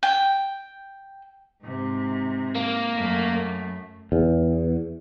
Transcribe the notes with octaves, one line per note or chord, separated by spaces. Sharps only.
G5
G#2 C3
A#3
F#2 A3
E2